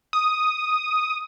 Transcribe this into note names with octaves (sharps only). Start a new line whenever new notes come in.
D#6